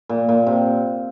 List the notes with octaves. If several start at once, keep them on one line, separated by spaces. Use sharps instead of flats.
A#2
A#2
C3